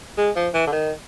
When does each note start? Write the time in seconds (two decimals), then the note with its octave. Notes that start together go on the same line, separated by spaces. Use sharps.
0.18 G#3
0.36 F3
0.54 E3
0.67 D3
0.72 D#3